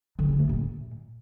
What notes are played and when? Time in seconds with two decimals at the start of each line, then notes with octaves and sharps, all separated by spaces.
0.19 D3
0.29 C#4
0.39 A3
0.49 A#2